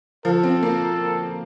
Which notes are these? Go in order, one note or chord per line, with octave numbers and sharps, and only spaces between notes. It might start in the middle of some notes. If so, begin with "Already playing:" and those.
F3 A4
C4
A#3